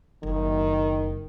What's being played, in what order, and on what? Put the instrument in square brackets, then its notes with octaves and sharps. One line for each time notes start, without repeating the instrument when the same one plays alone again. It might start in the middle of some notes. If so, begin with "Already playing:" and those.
[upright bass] F#1 [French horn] D#3